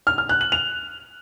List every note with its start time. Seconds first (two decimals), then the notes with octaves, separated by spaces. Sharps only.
0.07 F6
0.18 F6
0.29 F#6
0.41 F#7
0.52 F7